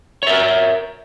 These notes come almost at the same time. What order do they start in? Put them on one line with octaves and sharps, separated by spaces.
C#5 E5 A#4